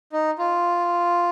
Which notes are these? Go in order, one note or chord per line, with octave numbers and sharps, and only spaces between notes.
D#4
F4